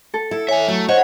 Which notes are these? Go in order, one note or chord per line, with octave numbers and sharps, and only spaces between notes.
A4
E4 A4
E2 C#5 E5 G#5
F#3 A3
C5 C#5 D#5 F#5